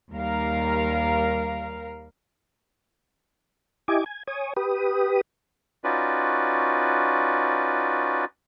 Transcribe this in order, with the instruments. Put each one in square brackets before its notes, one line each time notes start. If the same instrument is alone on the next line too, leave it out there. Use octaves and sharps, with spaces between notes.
[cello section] D#2 G3 A#4 F5
[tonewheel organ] E4 G4 D#5 G#5 D6
G#5
C#5 G#5 D#6
G4 B4 D#6
[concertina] C#4 D#4 F4 F#4 B4 D5